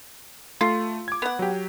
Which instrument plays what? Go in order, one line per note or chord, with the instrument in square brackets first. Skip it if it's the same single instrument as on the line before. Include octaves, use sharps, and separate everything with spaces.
[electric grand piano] A3 [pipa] F4
[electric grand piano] D6 G#6
[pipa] B3 F#5
[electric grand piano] F#3 G4